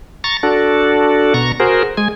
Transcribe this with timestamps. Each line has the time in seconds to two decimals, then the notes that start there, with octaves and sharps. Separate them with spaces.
0.24 A#5 C#6 A6
0.43 D4 F#4 A4
1.34 B2 A#5 C#6
1.60 F#4 G#4 A#4 C5
1.97 G#3 G#5